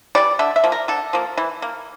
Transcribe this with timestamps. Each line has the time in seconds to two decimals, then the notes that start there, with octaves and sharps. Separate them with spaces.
0.15 E3 G3 D5
0.39 D3 E5
0.56 E5
0.64 F3 A#3
0.72 A#4
0.88 D3 A4
1.13 F3 A#3
1.37 E3
1.62 A#3